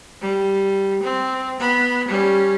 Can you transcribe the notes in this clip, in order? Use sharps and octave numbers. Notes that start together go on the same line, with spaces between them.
G3
C4
B3 B5
G3 C#4